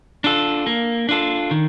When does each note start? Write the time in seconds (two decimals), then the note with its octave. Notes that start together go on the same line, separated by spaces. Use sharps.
0.24 D4 F4 A4
0.67 A#3
1.09 D4 F4 A4
1.51 D#3